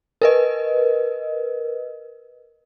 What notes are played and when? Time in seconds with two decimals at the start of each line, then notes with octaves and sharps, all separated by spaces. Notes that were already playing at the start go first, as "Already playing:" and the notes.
0.22 A#4 B4 D#5